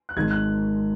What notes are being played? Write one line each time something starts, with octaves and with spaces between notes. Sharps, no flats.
F#6
G#1 G#2 D#3 G#3 G#6
F#6